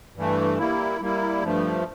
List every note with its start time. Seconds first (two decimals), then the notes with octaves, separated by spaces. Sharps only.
0.16 G2 E3 A3
0.58 G3 A#3 E4
1.00 G3 A#3 E4
1.43 G2 F3 A3